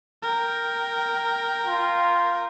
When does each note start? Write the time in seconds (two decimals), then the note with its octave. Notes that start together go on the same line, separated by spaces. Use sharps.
0.23 A#4 G5
1.66 F4